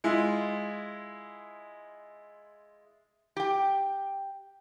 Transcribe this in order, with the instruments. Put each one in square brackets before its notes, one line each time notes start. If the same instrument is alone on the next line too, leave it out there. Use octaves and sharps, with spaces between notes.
[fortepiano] G#3 E4 F4
[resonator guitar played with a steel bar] G4 G5